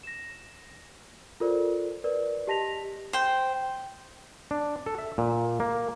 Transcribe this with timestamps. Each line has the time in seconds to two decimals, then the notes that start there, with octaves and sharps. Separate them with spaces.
0.03 A#6 E7
1.40 F4 A4 A#4 C5 D5
2.04 A#4 B4 D5
2.47 G4 D#5 A5 A#6 B6 F7
3.13 C5 G5
4.51 D4
4.86 A4
4.98 E5
5.18 A#2
5.60 A#3